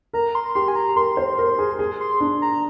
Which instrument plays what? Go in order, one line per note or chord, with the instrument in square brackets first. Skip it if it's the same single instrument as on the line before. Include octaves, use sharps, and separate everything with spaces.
[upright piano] A#4 [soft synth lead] A#5
[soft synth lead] C6
[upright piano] G4 [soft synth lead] C6
[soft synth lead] G#5
A#5
[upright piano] A#4 [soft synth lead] C6
[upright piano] C5
A#4
G#4
G#4
[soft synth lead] C6
[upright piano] D4
[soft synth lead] A#5